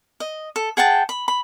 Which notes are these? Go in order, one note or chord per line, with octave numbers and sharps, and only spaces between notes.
D#5
A4
G#4 F#5 G5 A5
B5
B5